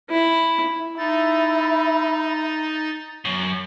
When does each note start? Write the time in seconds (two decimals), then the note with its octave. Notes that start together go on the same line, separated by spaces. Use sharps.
0.10 E4
0.98 D#4 E4 A6
3.25 F#2